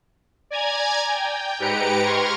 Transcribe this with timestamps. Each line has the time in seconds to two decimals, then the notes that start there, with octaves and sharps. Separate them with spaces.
0.50 D5 G#5 A#5 G#6
1.10 G5
1.59 G#2 G4 B4 A#5 C#7 D7
2.03 C6 C#6 F6 G#6 A#6